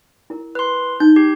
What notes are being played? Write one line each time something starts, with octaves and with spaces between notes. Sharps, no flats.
E4 A#4
B4 C6
D#4 G6
G4